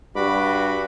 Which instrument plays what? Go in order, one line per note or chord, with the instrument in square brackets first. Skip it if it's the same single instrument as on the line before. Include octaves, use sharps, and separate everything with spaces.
[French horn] G2 [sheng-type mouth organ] F#4 B5 D6